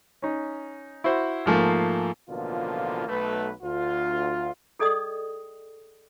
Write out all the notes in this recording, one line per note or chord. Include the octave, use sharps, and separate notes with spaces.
C#4 D#4
E4 F#4 C5
G#2 F3 A3 A#3
A1 B2 D3 F3 A#3 F4
B1 A3 B4
D2 F4
G#4 A4 D5 D#5 G5 D#6